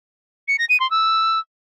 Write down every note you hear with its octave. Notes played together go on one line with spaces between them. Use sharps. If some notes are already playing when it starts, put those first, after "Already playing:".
C#7
A#6
D#7
C6
E6